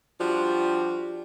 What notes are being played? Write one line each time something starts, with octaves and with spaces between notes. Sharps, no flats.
F3 G3 D4 F#4 G4